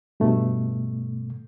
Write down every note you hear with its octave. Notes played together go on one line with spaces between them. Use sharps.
G2 B2 A3